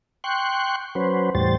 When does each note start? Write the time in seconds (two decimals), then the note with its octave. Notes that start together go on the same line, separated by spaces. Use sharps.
0.24 G5 C6 C#6 F#6
0.95 F#3 C#4 B4 C5
1.35 E2 A2 G3 C5 A6